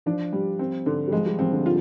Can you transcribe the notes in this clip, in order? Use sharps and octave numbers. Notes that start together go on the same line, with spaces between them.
F3 D4
G3
C4
D3
G3
F3 G#3
G3
F3 C4
D3
F4